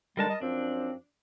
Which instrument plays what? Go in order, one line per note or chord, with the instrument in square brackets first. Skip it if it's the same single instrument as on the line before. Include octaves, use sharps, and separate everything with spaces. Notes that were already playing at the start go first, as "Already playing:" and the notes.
[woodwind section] D3 D#3 G#3 [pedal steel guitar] G3 A#4 A5
[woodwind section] D#5
[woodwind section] F#2 F3 C4 [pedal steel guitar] D4